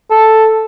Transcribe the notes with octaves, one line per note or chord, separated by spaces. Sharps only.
A4